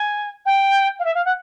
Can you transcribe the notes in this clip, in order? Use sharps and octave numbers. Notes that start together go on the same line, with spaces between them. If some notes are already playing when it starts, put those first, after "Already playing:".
Already playing: G#5
G5
F5
E5
F5
F#5